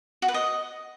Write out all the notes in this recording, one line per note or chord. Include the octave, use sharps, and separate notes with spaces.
F#4
B4
D#5